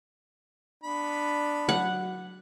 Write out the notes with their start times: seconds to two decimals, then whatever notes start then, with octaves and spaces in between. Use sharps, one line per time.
0.83 B3 D4 B5
1.69 F#3 F#5